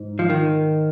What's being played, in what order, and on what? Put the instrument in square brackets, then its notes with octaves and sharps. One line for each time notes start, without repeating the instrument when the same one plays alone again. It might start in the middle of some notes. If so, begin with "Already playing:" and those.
Already playing: [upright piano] G#2
[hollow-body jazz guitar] F3
D#3